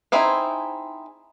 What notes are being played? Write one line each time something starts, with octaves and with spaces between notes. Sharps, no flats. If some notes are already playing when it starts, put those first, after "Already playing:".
C4 D#4 E4 G#4 C5